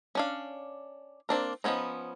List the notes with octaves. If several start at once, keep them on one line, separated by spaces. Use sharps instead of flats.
C#4 D4 F5
A#3 C4 D4 A#4
F3 F#3 B3 C#4 D#4